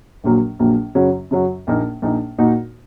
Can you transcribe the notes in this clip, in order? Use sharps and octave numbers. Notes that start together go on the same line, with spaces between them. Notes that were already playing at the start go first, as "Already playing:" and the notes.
A#1 A#2 F#3 A#3
A#1 A#2 F#3 A#3
F#2 C#3 F#3 C#4 F#4
F#2 C#3 F#3 C#4 F#4
A#1 A#2 A#3 D#4
A#1 A#2 A#3 D#4
A#2 A#3 D#4 F#4